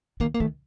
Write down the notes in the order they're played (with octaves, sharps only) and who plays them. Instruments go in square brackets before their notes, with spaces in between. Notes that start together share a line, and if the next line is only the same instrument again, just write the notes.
[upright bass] D#3 [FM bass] A#3
[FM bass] A#3
[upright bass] D#3 [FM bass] A3